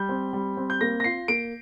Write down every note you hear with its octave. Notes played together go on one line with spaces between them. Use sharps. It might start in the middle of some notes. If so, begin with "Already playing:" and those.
Already playing: G3 G6
C4
G3
C4
G6
A#3 A#6
A#6
F4 C7
A#3 D7